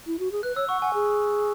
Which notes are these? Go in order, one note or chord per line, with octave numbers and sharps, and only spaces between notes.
E4
F#4
G#4
B4 F#6
C#5 E6
F#5 C#6
F#5 G#5
G#4